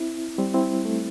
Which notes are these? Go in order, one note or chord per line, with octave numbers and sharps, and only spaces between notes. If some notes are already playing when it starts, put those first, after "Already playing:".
Already playing: C4 E4
G3 C4
C4 E4
A3